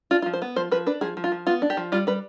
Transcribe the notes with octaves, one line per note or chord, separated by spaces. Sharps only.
D4 F4
F4
F3
C5
B3
F3 C5
F3 B4
D4 B4
F3 G#4
F3
F4
F3
B3 F4
D4
G4
F3
G3 F4
G3 B4